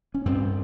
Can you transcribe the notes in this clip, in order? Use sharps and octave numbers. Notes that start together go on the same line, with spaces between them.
C#4
G2 C4